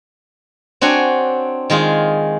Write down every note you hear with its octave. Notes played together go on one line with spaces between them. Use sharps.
C4 D4 F#4 C#5 G#5
D#3 G#3 F4 G#4